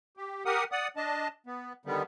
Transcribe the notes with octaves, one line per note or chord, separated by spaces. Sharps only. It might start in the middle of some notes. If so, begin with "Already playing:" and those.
G4
G4 A#4 F#5 D#6
D5 F#5 D#6
D4 D#5 A5
B3
D3 D#3 G3 B3